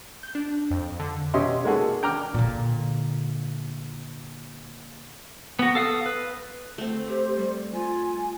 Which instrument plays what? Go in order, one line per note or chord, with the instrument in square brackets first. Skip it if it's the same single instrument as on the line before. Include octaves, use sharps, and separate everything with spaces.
[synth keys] G6
D4
F2
D3
[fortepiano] B2 C#4 G4 D#5 E5 C6
G#3 A#3 D#4 F#4 G#4 A4
G5 A#5 D6 F6
[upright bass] A#2 D3
[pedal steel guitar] B3 F#4
A4 F5 D#6
B4
[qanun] A3 C4
[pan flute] G4 [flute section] C5
[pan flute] G3
[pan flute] F4 [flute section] G#5